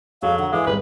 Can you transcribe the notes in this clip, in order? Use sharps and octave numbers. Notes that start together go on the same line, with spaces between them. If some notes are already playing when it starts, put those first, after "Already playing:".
F2 F#3 G#4 F5
D3 F#5 A#5
E3 G#3 F5 D6
G#1 G3 G#3 B4